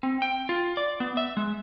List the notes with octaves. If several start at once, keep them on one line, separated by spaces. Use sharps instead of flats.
C4
G5
F4
D5
B3
E5
G#3